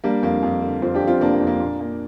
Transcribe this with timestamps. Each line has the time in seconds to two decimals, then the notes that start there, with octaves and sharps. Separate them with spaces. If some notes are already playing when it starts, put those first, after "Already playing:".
0.04 G3 A#3 D4
0.23 F2 A#3
0.43 F2
0.63 D3
0.82 F2 C4 F4
0.94 D4 G4
1.02 F2
1.07 C4 F4
1.20 F1 A#3 D4
1.34 A#3
1.41 F2
1.47 A#3 D4
1.60 A#2
1.80 A#3